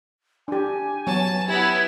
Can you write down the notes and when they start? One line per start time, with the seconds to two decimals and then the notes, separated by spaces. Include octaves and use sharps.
0.48 D4 G4 G#5
1.07 F#3 B3 C#5 A5
1.48 B3 E4 G4 G#6